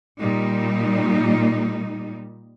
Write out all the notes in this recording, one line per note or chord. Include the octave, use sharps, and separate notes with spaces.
A#2 G3 D#4